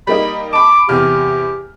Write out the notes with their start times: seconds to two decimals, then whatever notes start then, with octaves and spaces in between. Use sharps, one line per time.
0.07 G3 A#3 D#4 B5
0.53 A5 B5 D6
0.89 E2 C3 G4 F6